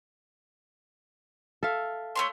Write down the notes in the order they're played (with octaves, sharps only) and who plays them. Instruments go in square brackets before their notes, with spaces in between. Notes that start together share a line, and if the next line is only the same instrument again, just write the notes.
[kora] A4 E5 F5
[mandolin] A3 C#5 C6